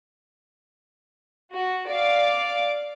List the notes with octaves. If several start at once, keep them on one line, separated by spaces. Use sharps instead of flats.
F#4
D5 F5 D6